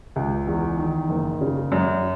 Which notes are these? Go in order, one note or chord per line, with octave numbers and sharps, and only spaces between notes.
C#2
E2
D#3
F#1
C#3
F#2